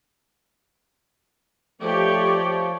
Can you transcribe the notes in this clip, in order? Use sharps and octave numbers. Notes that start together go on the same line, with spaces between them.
F3 A3 G4 C#5 D5